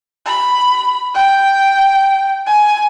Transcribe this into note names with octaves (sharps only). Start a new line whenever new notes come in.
B5
G5
G#5